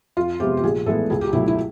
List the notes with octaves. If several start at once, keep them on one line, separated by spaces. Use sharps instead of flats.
F2 F4
C3 F3 G#3 B3 G4
G4
A#1 G#4
A2 E3 G#3 B3 A4
C#2 G#4
G4
B2 F#3 A3 E4
E4